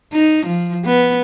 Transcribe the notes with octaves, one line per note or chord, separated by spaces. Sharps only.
D#4
F3
B3